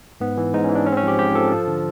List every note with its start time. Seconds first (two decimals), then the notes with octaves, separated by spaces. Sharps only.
0.20 G#2 B3
0.37 E3
0.53 G#2 D#4
0.64 E3 C#4
0.75 D4
0.86 G#2 C#4
0.92 C4
0.97 C#4
1.03 F3 G4
1.19 G#2 G4
1.35 F3 A4
1.52 F3
1.67 D3